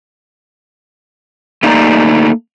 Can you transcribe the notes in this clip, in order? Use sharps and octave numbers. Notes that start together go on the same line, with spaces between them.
A3 A#3 D#4 D5 G5 A#5